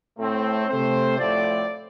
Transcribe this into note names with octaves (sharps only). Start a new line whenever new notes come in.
A2 A3 C4
C3 A3 C4 C5
A2 F3 A3 C4 D5